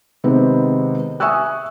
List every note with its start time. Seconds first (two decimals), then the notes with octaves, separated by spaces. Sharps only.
0.24 C3 D#3 G#3 B3 C4
1.20 E5 G#5 C#6 D#6 E6 F#6